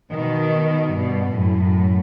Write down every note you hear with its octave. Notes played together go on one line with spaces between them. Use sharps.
B2 D#3
G2 B2
F#2 A2